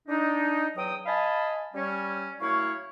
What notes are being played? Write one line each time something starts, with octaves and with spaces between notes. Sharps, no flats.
D4 D#4
E2 F#3 G5 D#6
D#5 F5 G#5 A5 B5
G3 C#4
F#2 A3 E4 C#5 F5 C#6